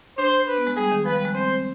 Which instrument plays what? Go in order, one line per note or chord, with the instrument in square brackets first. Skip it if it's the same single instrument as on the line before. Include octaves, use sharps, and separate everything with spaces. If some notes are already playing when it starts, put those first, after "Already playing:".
[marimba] D4 [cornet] C5
[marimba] D4 [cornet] B4
[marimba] B3
G#3
[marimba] G3 [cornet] G#4
[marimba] D#3
[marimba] F3 [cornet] B4
[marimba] G3
G#3
[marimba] C4 [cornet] C5